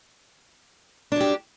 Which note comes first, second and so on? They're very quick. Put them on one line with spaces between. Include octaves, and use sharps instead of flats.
D4 F#3 G4